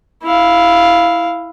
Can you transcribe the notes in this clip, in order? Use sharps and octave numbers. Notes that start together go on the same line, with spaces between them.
E4 F5